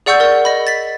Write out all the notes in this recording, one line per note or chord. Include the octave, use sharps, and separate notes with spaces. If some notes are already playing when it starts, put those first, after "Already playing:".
G#4 D5 F#5 C#6 E6 G6
A#4 D5
D#5 B5
A6 B6